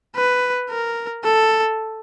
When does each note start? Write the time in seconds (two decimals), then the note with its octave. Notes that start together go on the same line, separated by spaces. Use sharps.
0.16 B4
0.70 A#4
1.24 A4